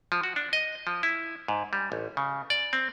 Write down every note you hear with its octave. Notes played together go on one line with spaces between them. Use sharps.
F3
F#4
D4
D#5
F3
E4
G#2
G3
A1
C#3
D5
C4